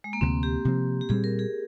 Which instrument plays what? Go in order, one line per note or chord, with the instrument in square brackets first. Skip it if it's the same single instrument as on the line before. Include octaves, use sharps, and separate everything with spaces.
[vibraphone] G#3
A#3
[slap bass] D2 C3 F3 [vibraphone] C4
[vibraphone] G4
[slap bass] C3 F3 C4
[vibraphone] G4
[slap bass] A#2 G3 C4 [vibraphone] G#4
[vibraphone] A#4
G#4